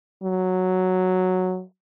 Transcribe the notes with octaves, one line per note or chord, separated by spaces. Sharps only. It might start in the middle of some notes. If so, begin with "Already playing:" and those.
F#3